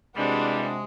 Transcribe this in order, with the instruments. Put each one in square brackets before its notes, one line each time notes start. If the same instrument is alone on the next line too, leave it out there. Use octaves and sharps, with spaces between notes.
[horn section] C3 G#3 [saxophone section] E3 G3 [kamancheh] D4 F#4